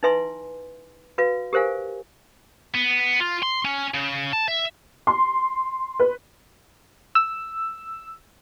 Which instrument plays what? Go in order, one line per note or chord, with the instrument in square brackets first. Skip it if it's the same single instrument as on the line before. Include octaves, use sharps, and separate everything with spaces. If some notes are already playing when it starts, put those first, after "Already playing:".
[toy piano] D#4 E4 B4 E5 G#5 C6
F#4 B4 F5
G4 A#4 C5 F5 G#5
[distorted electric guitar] B3
F4
C6
C#4
C#3
A5
E5
[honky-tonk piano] C6
B4
[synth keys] E6